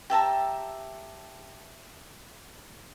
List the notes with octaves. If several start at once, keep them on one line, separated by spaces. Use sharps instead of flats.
G4 E5 A5 A#5